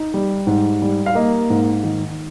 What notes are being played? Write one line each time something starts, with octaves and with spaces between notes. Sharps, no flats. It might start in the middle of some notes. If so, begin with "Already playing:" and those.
Already playing: D#4
G3
G#2
G3
F5
A#3 D#5
G#2
D#3